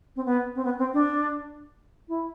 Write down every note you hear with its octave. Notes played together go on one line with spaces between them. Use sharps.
C4
B3
C4
B3
C4
D4
E4